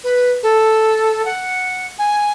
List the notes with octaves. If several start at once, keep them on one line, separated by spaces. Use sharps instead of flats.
B4
A4
F#5
G#5